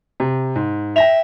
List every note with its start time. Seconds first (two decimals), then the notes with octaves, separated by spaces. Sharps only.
0.20 C3
0.56 G#2
0.96 E5 G5 A#6 F7